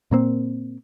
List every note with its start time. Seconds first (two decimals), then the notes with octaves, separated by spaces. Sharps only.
0.11 A#2 A#3 C4